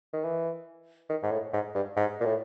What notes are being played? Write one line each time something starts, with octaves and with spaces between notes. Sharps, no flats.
D#3
E3
D#3
G#2
A2
G#2
G2
G#2
A#2
A2